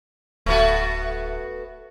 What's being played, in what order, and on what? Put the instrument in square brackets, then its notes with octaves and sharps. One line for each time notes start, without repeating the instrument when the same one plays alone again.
[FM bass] D1 [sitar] A3 B3 F#4